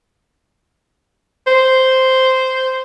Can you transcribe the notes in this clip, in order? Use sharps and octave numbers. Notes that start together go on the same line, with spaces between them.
C5